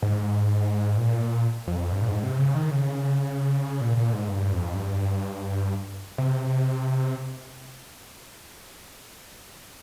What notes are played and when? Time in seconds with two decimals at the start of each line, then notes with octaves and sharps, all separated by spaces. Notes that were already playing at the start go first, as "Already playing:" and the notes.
0.02 G#2
0.97 A#2
1.68 F2
1.92 G2
2.02 A#2
2.08 G#2
2.23 C3
2.38 C#3
2.55 D#3
2.71 C#3
3.81 A#2
3.97 A#2
4.13 G#2
4.28 G2
4.52 F2
4.75 G2
6.18 C3